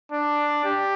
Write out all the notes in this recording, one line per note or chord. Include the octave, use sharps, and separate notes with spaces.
D4
G4